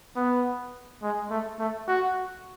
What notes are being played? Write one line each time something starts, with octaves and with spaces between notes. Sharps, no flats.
B3
G#3
A3
A3
F#4